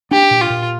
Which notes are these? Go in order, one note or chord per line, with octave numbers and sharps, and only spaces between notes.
D4 G4
A#2
F4
A#2